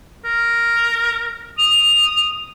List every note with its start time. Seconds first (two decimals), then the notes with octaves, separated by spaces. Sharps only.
0.25 A#4
1.58 D#6 F7